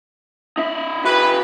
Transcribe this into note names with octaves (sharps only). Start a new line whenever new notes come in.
D#4 E5
F#4 G#4 B4